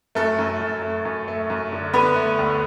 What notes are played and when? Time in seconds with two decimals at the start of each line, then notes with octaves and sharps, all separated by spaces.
0.15 F#2 A3 A4
0.38 F#2
0.60 F#2
0.82 A3
1.05 F#2
1.28 A3
1.50 F#2
1.72 D3
1.94 D3 B3 B4
2.16 A3
2.39 D2